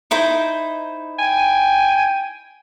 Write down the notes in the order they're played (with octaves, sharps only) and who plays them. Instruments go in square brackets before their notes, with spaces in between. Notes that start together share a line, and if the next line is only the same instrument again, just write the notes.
[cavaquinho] D#4 E4 C5
[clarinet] G5 [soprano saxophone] G#5